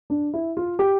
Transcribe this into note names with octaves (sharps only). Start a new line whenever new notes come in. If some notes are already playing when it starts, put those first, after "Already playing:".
D4
E4
F4
G4